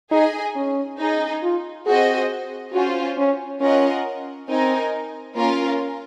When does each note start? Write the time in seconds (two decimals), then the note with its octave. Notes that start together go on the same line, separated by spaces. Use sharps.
0.11 D#4 G#4 D#5 G#5
0.56 C#4
1.00 D#4 G#4 D#5
1.43 F4
1.86 C4 F#4 G#4 C5 D#5
2.74 C#4 F4 F#4 C5
3.18 C#4
3.61 C#4 F4 A#4 D#5 F#5
4.48 C4 D#4 A#4 D#5 G#5
5.36 A#3 C#4 F4 A#4